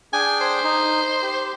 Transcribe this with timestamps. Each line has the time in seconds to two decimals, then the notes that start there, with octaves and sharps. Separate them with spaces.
0.13 D4 G#4 G5 G#5
0.41 C5
0.64 D#4
1.23 G4